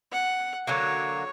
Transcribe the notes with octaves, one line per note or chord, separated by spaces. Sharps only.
F#5
D3 F#3 A#3 C#5